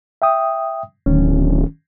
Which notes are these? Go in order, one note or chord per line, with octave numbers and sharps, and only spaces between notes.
E5 G5 D#6
D1 D#3 C#4